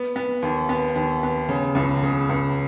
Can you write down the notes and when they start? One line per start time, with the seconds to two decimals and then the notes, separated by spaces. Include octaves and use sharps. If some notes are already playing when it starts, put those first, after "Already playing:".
Already playing: B3
0.16 B3
0.42 D#2
0.69 B3
0.95 D#2
1.23 B3
1.49 C#3
1.75 C#2
2.03 C#3
2.29 C#2